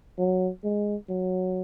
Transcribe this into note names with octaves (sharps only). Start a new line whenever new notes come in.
F#3
G#3
F#3